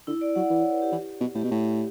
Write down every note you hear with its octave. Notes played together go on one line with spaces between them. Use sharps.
D3 E4
D5
F#3 F#5
E3 D5
C#5
B4
G4
E3
B2
A2 G4
B2
A2